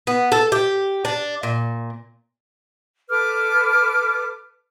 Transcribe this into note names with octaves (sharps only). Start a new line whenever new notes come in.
B3
A4
G4
D4
A#2
A4 B4 D6 F6